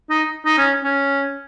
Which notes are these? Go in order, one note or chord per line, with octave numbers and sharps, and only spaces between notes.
D#4
D#4
C#4
C#4